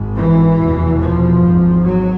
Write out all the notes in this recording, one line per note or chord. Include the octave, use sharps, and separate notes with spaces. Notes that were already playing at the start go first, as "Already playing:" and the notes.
Already playing: G#1 G#2
E3
F1 E2 B2
F3
G#1 G#2
F#3